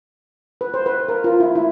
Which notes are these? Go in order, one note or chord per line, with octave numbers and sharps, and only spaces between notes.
B4
C5
B4
A#4
F4
E4
E4